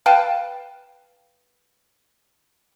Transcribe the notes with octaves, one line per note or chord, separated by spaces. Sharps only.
B4 F5 G5 A5